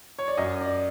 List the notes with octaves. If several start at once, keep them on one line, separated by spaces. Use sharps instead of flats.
C#5
D5
F#2 D#5
D5